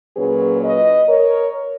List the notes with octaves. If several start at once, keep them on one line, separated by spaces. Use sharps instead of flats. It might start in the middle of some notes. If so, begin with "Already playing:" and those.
A#2 F#3 C#4 G#4 B4
B4 D#5
A#4 C#5